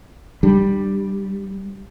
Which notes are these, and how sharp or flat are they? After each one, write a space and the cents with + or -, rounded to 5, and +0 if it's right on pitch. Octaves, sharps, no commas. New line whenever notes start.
G3 +0 D4 +30